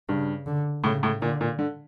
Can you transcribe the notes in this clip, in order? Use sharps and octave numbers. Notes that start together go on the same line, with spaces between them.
G2 C#3
D3
A2 C#3
A2
A#2 D3
A#2
D3